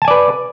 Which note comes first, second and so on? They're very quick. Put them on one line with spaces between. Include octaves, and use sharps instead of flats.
A5 G#5 D5 B4